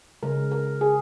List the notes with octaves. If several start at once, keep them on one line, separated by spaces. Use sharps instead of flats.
C#3 G#3 A#4
A#4
G#4